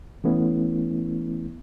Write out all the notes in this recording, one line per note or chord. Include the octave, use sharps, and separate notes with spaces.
E3 A3 B3 C#4 E4